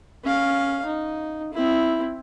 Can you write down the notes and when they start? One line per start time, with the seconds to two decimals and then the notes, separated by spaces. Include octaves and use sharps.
0.24 C#4 F5
0.86 D#4
1.53 C4 E4